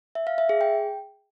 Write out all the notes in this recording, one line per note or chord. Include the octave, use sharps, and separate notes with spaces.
E5
F5
E5
G#4
G5